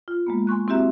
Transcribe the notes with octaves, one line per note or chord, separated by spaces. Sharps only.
F4
G#3 A#3 B3
G#5 C6 C#6 F#6
C4 E4 F#4 G4 E5 A#5